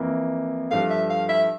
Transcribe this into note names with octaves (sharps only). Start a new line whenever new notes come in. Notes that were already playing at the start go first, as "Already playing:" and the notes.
Already playing: F2 E3 A#3 E4
G2 F3 A3 F5
E5
F5
E5